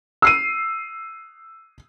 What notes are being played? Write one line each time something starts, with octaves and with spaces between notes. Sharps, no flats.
E6 C7 D#7